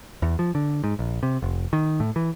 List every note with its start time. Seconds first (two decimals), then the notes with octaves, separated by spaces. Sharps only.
0.22 E2
0.39 F3
0.55 D3
0.84 G#2
0.99 A#1
1.23 C3
1.42 F1
1.73 D#3
2.00 A2
2.16 E3